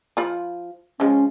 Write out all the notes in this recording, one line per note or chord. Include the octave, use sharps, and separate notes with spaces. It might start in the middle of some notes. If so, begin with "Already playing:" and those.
F3 F4 B5
F3 G#3 C#4